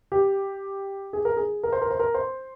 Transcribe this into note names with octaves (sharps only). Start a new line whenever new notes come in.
G4
G#4
A#4
G#4
A#4
C5
A#4
C5
A#4
C5